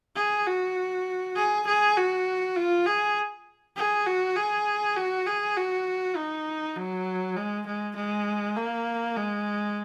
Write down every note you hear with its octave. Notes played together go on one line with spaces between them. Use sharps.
G#4
F#4
G#4
G#4
F#4
F4
G#4
G#4
F#4
G#4
F#4
G#4
F#4
D#4
F#3
G#3
G#3
G#3
A#3
G#3